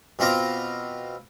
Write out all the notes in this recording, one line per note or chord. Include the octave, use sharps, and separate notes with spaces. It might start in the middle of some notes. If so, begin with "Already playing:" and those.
B2 C4 F4 A#5 D6